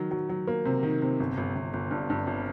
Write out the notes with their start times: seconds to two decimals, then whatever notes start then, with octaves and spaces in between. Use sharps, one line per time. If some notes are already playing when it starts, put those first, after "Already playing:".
Already playing: D#3 F#3
0.11 F#3
0.29 F#3
0.47 A#3
0.65 C3
0.83 D#3
1.02 C3
1.20 G1
1.37 G1
1.55 G1
1.73 G1
1.91 G2
2.10 G2
2.27 G1